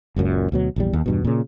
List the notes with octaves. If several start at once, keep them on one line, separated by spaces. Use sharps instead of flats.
F#1 C#2 F#2 A#2
D2 B2 F#3
A#1 E2 G3
D#2
E2 G2 B2
A#2 C#3